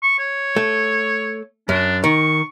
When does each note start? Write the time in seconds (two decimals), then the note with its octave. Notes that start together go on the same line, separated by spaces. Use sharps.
0.03 C#6
0.19 C#5
0.56 A3
1.69 F#2 D4
2.04 D#3 C#6